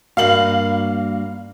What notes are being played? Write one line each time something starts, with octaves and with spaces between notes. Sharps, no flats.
G2 A#3 F#4 F5 F#7